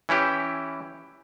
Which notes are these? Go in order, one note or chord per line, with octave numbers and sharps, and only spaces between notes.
E3 C#4 E4 G4